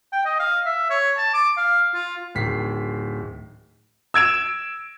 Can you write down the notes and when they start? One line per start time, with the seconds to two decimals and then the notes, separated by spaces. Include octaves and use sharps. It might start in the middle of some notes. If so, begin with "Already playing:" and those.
0.13 G5
0.25 D#5
0.39 F5
0.66 E5
0.90 C#5
1.17 A5
1.34 D6
1.57 F5
1.94 F4
2.35 D1 D#3 B6 C7
4.14 E6 G#6 D7 E7